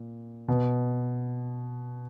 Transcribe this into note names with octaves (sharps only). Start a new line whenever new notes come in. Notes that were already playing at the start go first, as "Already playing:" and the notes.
Already playing: A#2
B2